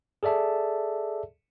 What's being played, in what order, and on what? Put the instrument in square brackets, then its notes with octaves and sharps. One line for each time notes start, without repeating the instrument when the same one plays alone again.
[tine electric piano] G#4 A4 D5 E5 A5